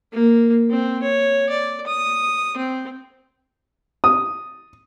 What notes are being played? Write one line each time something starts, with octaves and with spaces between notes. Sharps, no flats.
A#3
C4
C#5
D5
D#6
C4
D#6